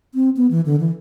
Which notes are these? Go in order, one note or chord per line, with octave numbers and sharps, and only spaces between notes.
C4
B3
E3
D3
E3